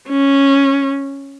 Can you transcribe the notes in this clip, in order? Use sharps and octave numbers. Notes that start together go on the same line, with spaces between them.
C#4